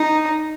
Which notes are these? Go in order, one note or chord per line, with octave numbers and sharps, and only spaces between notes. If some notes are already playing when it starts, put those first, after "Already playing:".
Already playing: D#4